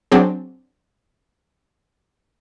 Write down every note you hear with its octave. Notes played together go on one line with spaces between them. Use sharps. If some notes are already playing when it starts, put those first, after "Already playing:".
F#3 C4 D4 G#4